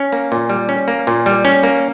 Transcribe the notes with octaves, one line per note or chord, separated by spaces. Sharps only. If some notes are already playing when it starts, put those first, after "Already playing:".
Already playing: C#4
A#3
A#2
G3
C#4
A#3
A#2
G3
C#4
A#3